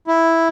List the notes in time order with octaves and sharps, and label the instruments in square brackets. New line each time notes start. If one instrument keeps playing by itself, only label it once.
[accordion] E4